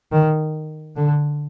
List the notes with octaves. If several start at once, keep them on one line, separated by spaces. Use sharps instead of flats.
D#3
D3